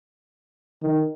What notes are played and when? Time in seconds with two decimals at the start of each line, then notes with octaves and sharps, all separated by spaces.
0.83 D#3